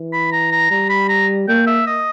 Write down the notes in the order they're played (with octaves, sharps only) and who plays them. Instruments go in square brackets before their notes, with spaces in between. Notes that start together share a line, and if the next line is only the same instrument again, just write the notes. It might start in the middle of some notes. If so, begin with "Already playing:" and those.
Already playing: [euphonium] E3
[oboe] B5
A#5
A#5
[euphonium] G3 [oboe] A#5
[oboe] B5
A#5
[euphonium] A#3 [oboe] G5
[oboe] E5
D#5